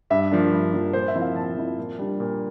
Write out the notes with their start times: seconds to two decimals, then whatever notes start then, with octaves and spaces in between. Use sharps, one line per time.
0.10 G2 E5
0.32 F3 A#3 D4
0.52 G2
0.73 F3 A#3 D4
0.93 A#2 C5
1.08 E5
1.15 F3 C4 E4
1.22 F5
1.35 A#2 A5
1.57 F3 C4 E4
1.78 A#2
1.99 G3 D4
2.20 A#2